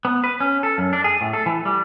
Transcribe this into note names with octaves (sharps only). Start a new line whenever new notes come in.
B3
B4
C#4
A4
F#2
D4
G#4
A2
A4
E3
G3